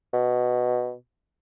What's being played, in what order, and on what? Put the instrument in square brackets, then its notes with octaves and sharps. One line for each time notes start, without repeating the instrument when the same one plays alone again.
[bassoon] B2